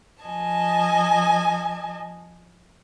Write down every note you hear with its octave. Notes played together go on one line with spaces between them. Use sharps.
F3 D#5 G#5 A5